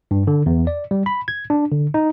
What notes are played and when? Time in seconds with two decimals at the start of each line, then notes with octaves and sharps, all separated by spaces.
0.11 G2
0.27 D3
0.46 E2
0.67 D5
0.91 G3
1.06 B5
1.28 G#6
1.50 D4
1.72 D3
1.94 D#4